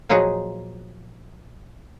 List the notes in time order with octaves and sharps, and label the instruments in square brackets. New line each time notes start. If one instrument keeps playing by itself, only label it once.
[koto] A#2 F3 F#3 D#4 F#4 G#4